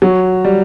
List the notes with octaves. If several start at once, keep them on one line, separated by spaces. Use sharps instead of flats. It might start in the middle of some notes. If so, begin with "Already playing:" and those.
F#3
G3